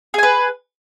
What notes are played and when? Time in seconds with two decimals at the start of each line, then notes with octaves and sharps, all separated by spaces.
0.14 G#4
0.18 G#5
0.23 B4